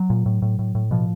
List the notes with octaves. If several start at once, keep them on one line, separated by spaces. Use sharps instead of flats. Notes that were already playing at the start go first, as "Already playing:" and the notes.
Already playing: F#3
A#2
A2
A2
A2
A2
B2 F3